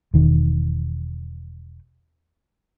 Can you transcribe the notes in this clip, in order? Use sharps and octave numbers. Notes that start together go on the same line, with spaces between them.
E1 D#3